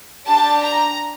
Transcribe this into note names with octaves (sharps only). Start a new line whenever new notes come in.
D4 G4 A5
A#5